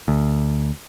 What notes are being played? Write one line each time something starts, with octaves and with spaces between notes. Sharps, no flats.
D2